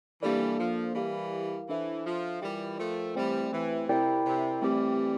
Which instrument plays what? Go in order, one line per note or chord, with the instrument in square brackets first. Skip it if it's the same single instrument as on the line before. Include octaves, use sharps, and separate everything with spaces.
[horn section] E3 G3 [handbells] A#3 D4 A4 D5
[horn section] F3
[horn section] E3 G3 [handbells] E4 G4 A#4 F5
[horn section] E3 [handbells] D4 A4 C5 E5
[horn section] F3
[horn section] E3 G3 [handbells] F4 A#4 D5 G5
[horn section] F3 A3
[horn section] E3 G3 [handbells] A3 C4 G4 C5 G5
[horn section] E3
[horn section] C3 [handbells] E4 A#4 D5 G5
[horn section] C3
[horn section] E3 G3 [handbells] A3 C4 G4